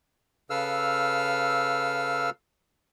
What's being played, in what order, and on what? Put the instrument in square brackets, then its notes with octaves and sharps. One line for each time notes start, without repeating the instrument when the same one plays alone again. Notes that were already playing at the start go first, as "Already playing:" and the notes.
[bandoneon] C#3 A4 B4 F5 E6 F6